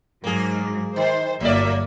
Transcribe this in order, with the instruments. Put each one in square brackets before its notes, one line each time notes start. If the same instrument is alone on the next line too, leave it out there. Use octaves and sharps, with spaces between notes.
[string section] G#2 F#3 [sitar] A#3 G#4
[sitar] D#3 [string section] C5
[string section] G1 A#3 E5 [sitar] F#3 D5